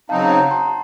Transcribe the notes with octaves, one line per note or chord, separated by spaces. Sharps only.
C#3 F#3 C4 D#4 F5 A5
F#5 A#5
A5 C6